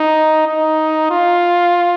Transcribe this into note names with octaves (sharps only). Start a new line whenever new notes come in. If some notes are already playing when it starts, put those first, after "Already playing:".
Already playing: D#4
D#4
F4